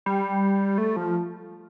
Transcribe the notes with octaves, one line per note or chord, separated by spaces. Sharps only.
G3
A3
F3